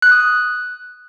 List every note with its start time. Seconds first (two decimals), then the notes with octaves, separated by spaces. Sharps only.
0.02 F#6
0.11 D#6
0.20 F#6